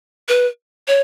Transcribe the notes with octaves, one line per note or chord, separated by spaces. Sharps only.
B4
C#5